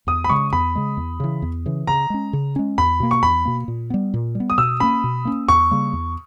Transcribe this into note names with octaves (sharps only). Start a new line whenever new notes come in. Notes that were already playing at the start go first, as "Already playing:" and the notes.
E2 D#6
B5
C#3 G#3 C#6
E2 B5
C#3 G#3
E2
C#3 E3
E2
C#3 E3
C#3 A#5
G#3 C#4
C#3
G#3 C#4
E2 B5
B2 A#3
C#6
E2 B5
B2 A#3
A#2
G3 B3
A#2
G3
B3
D#6
B2 E6
A#3 C#4 B5
B2
A#3 C#4
E2 C#6
C#3 G3 A#3
E2